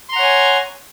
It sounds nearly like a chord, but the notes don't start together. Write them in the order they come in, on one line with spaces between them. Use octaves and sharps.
C6 A#5 F#5 C#5 G#5